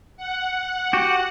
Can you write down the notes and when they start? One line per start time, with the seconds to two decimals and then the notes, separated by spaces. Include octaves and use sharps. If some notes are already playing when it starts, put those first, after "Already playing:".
0.17 F#5
0.93 F#4 G4